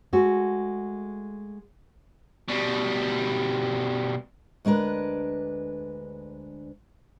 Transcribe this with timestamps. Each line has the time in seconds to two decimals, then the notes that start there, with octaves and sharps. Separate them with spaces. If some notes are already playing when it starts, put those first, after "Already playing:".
0.13 G#3 A3 F#4
2.48 B2 G3
4.65 D2 G#3 D4 A#4 B4